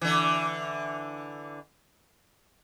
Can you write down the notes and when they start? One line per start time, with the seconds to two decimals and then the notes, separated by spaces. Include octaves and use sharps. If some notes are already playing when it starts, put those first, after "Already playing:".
0.01 D3 E3